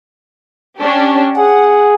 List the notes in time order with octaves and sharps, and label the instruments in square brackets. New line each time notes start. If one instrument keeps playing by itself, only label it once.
[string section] C#4 D4 G4
[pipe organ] G#4 [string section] F#5